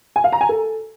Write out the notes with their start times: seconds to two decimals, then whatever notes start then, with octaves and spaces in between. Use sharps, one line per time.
0.16 G#5
0.24 F5
0.32 A#5
0.41 G#5
0.49 A4